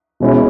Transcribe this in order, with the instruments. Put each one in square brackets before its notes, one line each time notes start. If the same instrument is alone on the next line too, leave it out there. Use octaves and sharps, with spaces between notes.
[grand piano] B2 G#3 C#4 E4